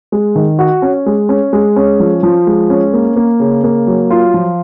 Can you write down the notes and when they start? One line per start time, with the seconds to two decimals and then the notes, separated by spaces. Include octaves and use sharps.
0.12 G#3
0.36 D#3
0.59 F#4
0.82 C#4
1.06 G#3
1.29 C#4
1.53 G#3
1.76 C#4
2.00 F3
2.23 F3
2.47 G#3
2.70 C#4
2.93 A#3
3.16 A#3
3.40 C#3
3.64 A#3
3.87 F#3
4.10 F4
4.34 F3